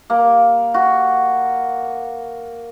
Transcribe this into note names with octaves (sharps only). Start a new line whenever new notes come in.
A#3
F#4